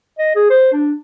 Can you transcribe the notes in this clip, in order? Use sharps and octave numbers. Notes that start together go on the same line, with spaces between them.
D#5
G#4
C5
D4